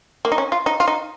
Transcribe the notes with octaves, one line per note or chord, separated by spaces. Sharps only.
A#3
D#4
C#4
F4
D#4
F4
D#4